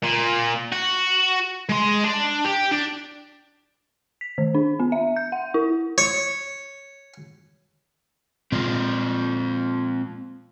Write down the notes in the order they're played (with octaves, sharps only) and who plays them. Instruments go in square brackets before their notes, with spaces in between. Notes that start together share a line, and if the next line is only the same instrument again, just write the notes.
[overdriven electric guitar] A#2
F#4
G#3 C6
D4
G4
D4
[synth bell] B6
D#3
D4
B3
E5
G6
F#5
E4
[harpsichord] C#5
[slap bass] A#2 G#3 [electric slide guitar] C4 F4 D5